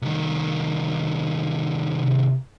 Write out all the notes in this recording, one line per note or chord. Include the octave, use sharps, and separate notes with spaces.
C2 D#3
C3